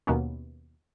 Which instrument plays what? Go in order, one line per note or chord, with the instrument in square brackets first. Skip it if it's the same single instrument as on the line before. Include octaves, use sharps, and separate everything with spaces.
[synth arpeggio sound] D#2 B2 A#3 B3 C#4